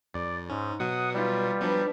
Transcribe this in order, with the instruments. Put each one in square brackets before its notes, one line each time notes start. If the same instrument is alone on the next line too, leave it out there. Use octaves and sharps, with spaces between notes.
[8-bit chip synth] F2 [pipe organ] D5
[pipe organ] G#2 [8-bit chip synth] C#4
[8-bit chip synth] B2 F#3 [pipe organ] F#5 D#6
[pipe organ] G3 [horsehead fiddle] F4 B4
[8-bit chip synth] F3 F#3 B3 [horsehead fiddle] D4 B4